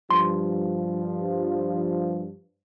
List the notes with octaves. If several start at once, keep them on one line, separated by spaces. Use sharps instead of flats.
G2 F3 C6